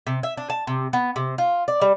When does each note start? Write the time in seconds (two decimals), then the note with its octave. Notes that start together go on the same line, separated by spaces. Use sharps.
0.07 C3
0.23 E5
0.37 D4
0.50 A5
0.67 C3
0.93 B3
1.16 C3
1.38 F4
1.68 D5
1.81 G3